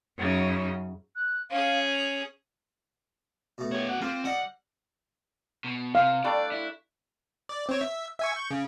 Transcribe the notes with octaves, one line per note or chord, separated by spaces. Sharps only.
F#2 C#3 D#4
F#6
C#4 G#4 F5
F7
B2 A3
F#4 G#4 C#5
F#5
A#3 C4 F4
G3 D5 D#5 F#5
B2
C3 F5
G3 A3 D4 D5
E4
D5
C4 C#5
E5
E5 G#5 C#6
C#6 G6
C#3